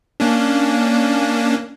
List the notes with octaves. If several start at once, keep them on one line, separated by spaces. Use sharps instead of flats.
A#3 C#4 D4